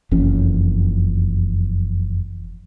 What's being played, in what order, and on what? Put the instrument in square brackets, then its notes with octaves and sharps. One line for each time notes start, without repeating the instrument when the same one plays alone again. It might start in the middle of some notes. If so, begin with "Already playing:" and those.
[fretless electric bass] F#1 F2 E3 C#4